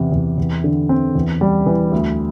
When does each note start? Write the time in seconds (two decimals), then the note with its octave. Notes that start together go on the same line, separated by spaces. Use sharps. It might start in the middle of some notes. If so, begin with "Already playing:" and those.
Already playing: E2 C3
0.12 E2
0.38 E2
0.64 D3
0.89 C4
1.15 E2
1.41 G3
1.66 E3
1.92 D2